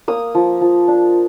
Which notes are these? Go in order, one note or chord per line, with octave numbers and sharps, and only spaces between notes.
A#3 D#6
F3
F3
D4